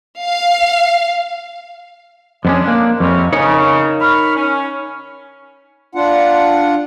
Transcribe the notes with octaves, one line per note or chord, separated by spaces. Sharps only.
F5
F2 G#3 B3 C#4 D4
A#3
F2 C3 G3 C#4
C#3 D#4 A#4 C#5
B5 C#6 F6
C#4
D4 F4 F#5